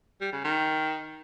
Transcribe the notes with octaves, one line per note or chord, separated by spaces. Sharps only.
G3
C#3
D#3